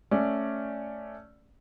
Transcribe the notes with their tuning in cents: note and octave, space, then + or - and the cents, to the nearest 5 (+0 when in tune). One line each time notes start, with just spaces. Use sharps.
A3 +0 C#4 +0 D5 +5